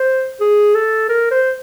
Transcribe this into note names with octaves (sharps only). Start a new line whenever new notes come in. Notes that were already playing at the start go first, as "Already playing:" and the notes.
Already playing: C5
G#4
A4
A#4
C5